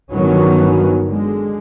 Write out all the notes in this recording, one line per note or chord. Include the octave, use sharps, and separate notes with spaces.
G1 D3 D#3 F#3 B3 C#4
D3 G#3